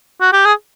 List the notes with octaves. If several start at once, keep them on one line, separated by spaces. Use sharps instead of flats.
F#4
G4
G#4